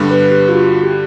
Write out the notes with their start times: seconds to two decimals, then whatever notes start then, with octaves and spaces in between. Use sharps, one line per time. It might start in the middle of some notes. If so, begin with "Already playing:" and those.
Already playing: G2 D3 G3 B3
0.11 B4
0.31 G4
0.49 F4
0.52 F#4
0.84 G4